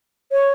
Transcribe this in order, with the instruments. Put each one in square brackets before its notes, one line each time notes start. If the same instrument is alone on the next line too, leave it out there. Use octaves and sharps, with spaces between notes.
[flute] C#5